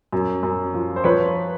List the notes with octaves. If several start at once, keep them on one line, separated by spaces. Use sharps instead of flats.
F#2
F#2
F3
C5
F3 B4 C#5